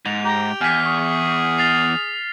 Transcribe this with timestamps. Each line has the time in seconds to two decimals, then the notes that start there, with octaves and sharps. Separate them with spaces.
0.06 G#2 F7
0.25 G4 A#5
0.61 E2 G#5 F6 B6
0.84 G#4 C#6
1.58 F6 A6 C7 F7